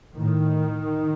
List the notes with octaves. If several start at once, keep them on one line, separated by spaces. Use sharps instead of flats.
A2 D#3